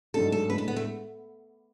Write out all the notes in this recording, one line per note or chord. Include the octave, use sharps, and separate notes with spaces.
G#2 F#3 A3 D4 A4
A4
A2 G#3 D4 B4
A4
B3
A3